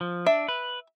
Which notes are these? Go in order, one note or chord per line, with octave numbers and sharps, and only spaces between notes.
F3
D4 E5
B4